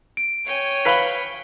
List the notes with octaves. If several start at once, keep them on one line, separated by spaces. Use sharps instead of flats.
D7
C#5 G5 G#5
B4 F5 B5 B6 G7